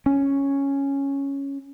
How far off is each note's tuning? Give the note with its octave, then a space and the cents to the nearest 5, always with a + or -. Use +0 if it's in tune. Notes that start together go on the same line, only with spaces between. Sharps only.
C#4 +0